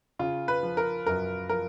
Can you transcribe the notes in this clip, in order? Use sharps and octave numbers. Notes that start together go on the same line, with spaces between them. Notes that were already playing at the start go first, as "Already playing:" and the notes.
C#3 F4
B4
F3
A#4
F#2 A#4
F3 A#4